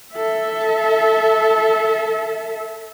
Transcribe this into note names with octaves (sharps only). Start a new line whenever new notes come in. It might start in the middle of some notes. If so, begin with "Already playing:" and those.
A4 E5